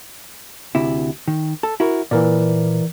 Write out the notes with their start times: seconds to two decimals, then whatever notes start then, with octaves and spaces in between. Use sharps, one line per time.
0.75 D2 C3 E4
1.28 D#3
1.63 A4
1.80 E4 F#4 A#4
2.11 A#2 E3 A#4 D5